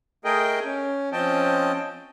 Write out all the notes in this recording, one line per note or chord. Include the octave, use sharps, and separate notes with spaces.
A3 G#4 A#4 D#5 G5
C#4
F3 C4 C#4 D#5 G5 A5